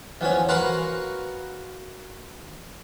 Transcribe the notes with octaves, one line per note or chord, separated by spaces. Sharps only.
E2 F3 C#4
F#4 A#4 B4 F5 C6 C#6